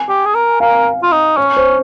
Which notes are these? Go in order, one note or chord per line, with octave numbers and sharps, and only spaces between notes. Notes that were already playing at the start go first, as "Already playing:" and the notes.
Already playing: G#5
G4
G#4
A#4
A#4 F5
F4
D#4
C#4 C#5
C5